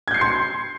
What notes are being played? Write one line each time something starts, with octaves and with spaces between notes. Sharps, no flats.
C6 G6 G#6 C7 C#7